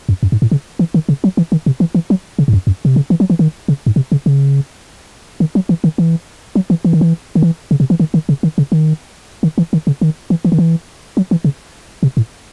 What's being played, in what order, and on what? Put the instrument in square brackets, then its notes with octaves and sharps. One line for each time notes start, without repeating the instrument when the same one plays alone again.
[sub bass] F#2
F#2
G#2
A2
C#3
E3
D#3
C#3
F#3
E3
D#3
C3
E3
E3
F#3
C#3
G#2
F#2
F#2
C3
C#3
E3
F#3
E3
D#3
C#3
G#2
C3
C#3
C#3
D#3
F#3
E3
D#3
E3
F#3
E3
E3
D#3
E3
D#3
E3
C#3
C3
E3
D#3
D#3
C#3
D#3
C#3
D#3
D#3
E3
D#3
C#3
D#3
E3
E3
D#3
E3
F#3
E3
C#3
C3
A2